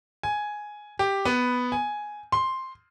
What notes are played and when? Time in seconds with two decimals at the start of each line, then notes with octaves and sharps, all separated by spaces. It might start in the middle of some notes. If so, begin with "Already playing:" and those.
0.23 G#5
0.99 G4
1.25 B3
1.72 G#5
2.32 C6